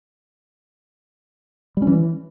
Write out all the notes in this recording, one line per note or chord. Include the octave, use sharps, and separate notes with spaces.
G3
C#4
E3